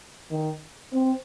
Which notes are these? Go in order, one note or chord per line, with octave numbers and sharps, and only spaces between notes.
D#3
C4